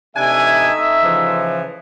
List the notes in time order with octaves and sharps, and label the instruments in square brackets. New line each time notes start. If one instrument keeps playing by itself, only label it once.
[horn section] C3 D4 G#5 [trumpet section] A3 D#4 E5
[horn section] C#3 E3 F3